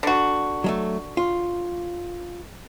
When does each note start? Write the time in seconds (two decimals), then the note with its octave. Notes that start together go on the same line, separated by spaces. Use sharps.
0.03 D3 F#4
0.64 F#3 G#3 A3
1.17 F4